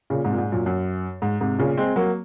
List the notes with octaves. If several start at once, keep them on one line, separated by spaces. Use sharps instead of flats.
A#2 C#3
G#2 C3
A#2
G#2
F#2 A#2
F#2
G#2
G#2 C3
A#2 C#3
G#3 C4
F#3 A#3